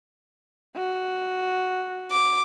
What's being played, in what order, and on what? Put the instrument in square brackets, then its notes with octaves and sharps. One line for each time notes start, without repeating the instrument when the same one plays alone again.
[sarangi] F#4
[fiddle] D6